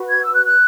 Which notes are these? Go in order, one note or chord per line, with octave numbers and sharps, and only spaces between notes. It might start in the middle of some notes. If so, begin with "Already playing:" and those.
Already playing: F#4 B4
G#6
E6
F#6
F#6